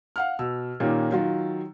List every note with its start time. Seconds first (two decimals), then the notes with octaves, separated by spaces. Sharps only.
0.16 F5 F#5 F6
0.39 B2 E6
0.80 A#2 D#3 A#3 C#4 G4
1.11 D#3 F#3 F4